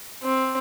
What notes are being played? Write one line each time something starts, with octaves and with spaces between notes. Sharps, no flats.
C4